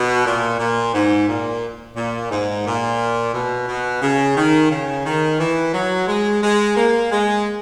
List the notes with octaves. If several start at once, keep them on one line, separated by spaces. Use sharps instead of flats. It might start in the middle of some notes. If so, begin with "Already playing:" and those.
Already playing: B2
A#2
A#2
G#2
A#2
A#2
G#2
A#2
B2
B2
C#3
D#3
C#3
D#3
E3
F#3
G#3
G#3
A#3
G#3